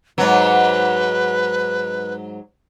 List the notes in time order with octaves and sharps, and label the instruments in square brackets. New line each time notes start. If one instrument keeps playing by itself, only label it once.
[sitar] G#2 F#3 [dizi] B4